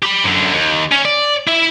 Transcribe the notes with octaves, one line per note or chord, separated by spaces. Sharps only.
G4 B5
F#2 D3
D#2
C#4 C#5
D5
E4 E5